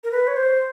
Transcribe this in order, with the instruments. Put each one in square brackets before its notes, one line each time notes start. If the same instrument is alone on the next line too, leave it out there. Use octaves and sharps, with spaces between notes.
[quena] A#4
B4
C#5
C5